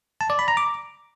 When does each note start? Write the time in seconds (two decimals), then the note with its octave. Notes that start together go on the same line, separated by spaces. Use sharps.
0.21 A5
0.30 D5
0.39 B5
0.48 A#5
0.57 D6